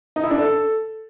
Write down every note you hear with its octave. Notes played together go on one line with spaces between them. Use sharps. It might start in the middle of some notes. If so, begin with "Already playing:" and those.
D#4
E4
D4
A4